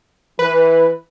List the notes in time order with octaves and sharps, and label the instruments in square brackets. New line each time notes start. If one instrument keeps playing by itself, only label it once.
[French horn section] E3 [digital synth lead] B4